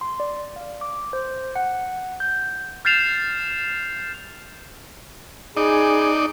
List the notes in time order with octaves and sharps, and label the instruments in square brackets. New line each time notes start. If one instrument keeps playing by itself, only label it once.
[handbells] C6
D5
F5
D6
C5
F#5
G6
[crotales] F6 G6 A6 C7 E7 F7
[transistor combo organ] D#4 D5 [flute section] G#4 G#5 B5